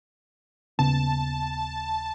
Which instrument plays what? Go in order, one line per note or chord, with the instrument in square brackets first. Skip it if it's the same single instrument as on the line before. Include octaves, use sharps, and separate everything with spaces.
[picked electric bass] D#1 C#3 B3 [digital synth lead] A5